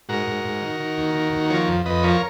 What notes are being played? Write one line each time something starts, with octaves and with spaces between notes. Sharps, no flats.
G#2 F#4 A#4
G#2
G#2
D#3
D#3
D#2
D#3
D#2
F3 A#4 C#5
F2
F2 B4 D#5
F3 A#4 C#5